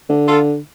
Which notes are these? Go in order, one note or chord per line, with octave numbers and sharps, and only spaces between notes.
D3
F4 A4